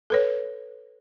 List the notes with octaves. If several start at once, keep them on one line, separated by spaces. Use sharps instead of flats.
A4 B4 C#5